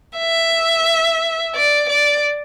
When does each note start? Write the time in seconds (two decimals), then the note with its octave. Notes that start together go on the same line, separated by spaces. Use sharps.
0.18 E5
1.55 D5
1.90 D5